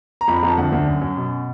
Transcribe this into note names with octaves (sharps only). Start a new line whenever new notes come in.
A#5
F2 B5
A#5
F2
A5
D2 F#5
D2
F#2
F#2
B2